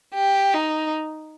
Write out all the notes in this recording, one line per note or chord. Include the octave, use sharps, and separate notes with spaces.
G4
D#4